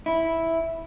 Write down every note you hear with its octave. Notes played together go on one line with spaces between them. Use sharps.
E4